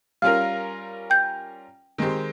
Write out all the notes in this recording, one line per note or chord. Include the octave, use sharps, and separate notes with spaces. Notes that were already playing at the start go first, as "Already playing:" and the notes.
G3 C#4 F4 A#4 F5 F6
G5 G6
D#3 G#3 C4 G4